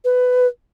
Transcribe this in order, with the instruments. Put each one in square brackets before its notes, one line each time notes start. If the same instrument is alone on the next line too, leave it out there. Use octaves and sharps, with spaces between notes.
[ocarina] B4